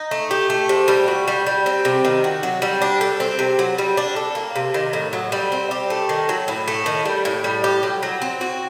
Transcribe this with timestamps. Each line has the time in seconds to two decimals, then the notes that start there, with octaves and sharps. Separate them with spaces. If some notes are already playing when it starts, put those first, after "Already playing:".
Already playing: D#4
0.11 A3
0.31 G4
0.50 A3
0.69 C3
0.88 G3
1.08 F#4
1.28 G3
1.47 G3
1.66 C4
1.85 C3
2.05 D#3
2.24 F#4
2.43 F#3
2.62 G3
2.82 D4
3.01 A4
3.20 C4
3.39 C3
3.59 F#3
3.78 G3
3.97 D4
4.16 A4
4.35 A#3
4.56 C3
4.74 D#3
4.93 A2
5.13 F#3
5.32 G3
5.52 C4
5.71 G4
5.90 A3
6.09 D#3
6.29 F#3
6.48 A2
6.68 A3
6.86 D#3
7.05 G3
7.25 A2
7.44 G3
7.64 G4
7.83 F#3
8.03 F#3
8.22 C4
8.41 F#4